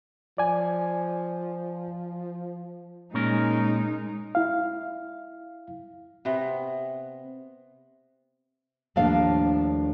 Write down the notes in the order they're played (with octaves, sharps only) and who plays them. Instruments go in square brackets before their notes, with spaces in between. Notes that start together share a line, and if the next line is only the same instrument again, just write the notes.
[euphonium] F3 [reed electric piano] D5 G#5
[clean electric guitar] A#2 C#4 A#4 [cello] G#3 D#4
[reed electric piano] E4 F5
[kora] C3 B3
[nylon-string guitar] D#2 A2 F3 A#3 D4 F5